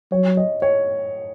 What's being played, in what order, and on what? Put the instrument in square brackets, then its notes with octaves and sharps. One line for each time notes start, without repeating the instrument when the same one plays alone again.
[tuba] F#3 [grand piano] C#5
[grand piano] D#5
C#5